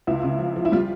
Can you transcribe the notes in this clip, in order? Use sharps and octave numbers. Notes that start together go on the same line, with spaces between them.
C#2 E4
C#3
F3
F3
E4
G3 F4